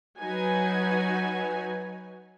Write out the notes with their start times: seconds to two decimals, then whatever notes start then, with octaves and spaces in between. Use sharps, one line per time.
0.19 F#3 D#4 F#4 B4 G#5